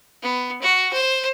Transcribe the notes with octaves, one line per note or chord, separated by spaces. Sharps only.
B3
F#4
C5